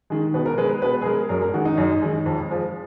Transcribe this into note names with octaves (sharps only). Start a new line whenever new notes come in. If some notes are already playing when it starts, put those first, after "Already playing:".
D#3 G#3
B2 B4
A#4
G#3 B4
B2 B4
G#4
G#3 A#4
F#2 A#4
A#4
D#3 G#3 F#4
D#4
F#2
D#3 G#3
F2
F3 G#3